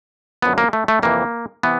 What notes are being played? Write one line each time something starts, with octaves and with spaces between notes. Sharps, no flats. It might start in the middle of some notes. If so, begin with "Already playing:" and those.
F#2 D3 F3 B3
A#3
A3
A3
F2 C3 E3 A#3
C3 E3 B3